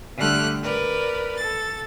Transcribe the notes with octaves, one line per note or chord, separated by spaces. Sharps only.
D3 G3 A3 G4 F6 F#6
A#4 B4 D5
A4 A6